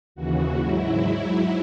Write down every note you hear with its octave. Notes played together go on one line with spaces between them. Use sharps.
D#2 C#3 E3 F#4
G#2 F#3 E4